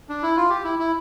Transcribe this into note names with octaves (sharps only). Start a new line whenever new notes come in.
D4
E4
F4
G4
E4
E4